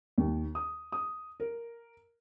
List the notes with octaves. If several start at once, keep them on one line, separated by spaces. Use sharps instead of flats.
D#2
D#6
D#6
A#4